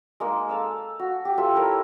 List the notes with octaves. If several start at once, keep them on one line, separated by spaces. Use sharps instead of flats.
G#3 A#3 D#4
A4 F5 E6
F#4
G4
F4 G4 A4 E5
E4 A4 A#4 C#5